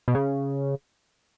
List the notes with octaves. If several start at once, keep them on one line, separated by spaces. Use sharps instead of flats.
B2
C#3